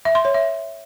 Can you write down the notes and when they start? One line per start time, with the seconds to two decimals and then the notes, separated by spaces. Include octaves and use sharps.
0.05 E5
0.15 C6
0.25 C#5
0.34 E5